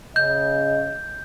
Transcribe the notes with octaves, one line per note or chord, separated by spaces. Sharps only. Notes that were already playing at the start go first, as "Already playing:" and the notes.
C#3 D#5 G6